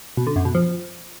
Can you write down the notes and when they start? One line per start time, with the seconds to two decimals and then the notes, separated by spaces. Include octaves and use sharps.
0.17 B2
0.27 D3
0.36 F#2
0.45 B2
0.55 F3